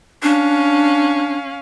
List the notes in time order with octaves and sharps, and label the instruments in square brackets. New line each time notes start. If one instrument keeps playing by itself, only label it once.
[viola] C#4 F5 [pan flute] D4